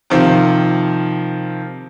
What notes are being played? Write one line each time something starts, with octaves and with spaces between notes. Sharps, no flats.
C3 D#3 F3